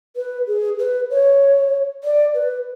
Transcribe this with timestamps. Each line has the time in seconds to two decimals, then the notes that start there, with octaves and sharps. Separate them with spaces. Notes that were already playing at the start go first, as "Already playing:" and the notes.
0.16 B4
0.48 G#4
0.79 B4
1.10 C#5
2.04 D5
2.34 B4